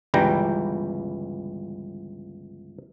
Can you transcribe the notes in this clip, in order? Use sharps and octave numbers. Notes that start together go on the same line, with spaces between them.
G1 C#2 E3 G3 G5 A#5